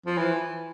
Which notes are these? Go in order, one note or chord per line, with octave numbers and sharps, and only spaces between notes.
F3
E3